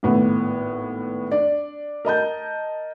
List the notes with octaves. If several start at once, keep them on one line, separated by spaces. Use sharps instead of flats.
G#1 A2 B3
D4 D5
A#4 D#5 A5 G6